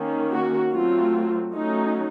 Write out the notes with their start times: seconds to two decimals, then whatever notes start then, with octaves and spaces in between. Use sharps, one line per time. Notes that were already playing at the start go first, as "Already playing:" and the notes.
Already playing: D#3 A#3 C#4
0.32 F#4
0.73 F#3 A3 C4 F4
1.54 F#3 A3 C#4 D#4